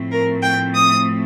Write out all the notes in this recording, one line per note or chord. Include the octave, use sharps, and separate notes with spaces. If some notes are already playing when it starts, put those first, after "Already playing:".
Already playing: A2 F3 A3 C4
A#4
G5
D#6